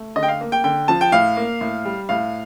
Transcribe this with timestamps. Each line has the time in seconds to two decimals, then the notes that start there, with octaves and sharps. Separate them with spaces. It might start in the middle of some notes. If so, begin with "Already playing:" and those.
Already playing: A3
0.16 D3 D#5
0.23 G5
0.28 F5
0.41 A#3
0.52 G5
0.64 D3 G5
0.88 F3 A5
1.01 G5
1.12 A2 F5
1.37 A#3
1.61 A2
1.85 G3
2.09 A2 F5